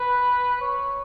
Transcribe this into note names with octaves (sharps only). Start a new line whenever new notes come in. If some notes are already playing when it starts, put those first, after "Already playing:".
Already playing: B4
C#5